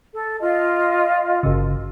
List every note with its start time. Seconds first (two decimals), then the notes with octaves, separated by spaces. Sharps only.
0.14 A4
0.41 F4 D#5
1.43 G1 C#3